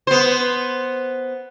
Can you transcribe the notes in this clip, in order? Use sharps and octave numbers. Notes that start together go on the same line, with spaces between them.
B3 C5